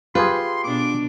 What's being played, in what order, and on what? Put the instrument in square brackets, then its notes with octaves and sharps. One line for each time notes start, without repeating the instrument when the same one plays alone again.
[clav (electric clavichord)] F4 G4 G#4 [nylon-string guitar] B4 [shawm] C6
[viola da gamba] B2 D4 [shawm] D6